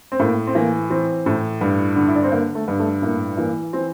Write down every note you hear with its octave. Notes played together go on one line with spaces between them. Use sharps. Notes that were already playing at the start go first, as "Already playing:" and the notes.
C4
A2 A#3
C4
E3 A#3
E3 C4
A2
G2
D3
E4
D4
C4
D3 A#3
A3
G2
A3
A2 A#3
E3 A#3
E3 C4